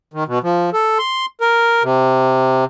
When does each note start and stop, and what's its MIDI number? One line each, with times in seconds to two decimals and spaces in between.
0.14 0.24 51
0.28 0.39 47
0.43 0.70 53
0.73 0.98 69
0.99 1.26 84
1.41 1.83 70
1.83 2.65 48